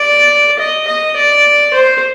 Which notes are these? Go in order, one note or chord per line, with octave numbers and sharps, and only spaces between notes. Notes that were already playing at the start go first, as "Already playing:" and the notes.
Already playing: D5
D#5
D#5
D5
C5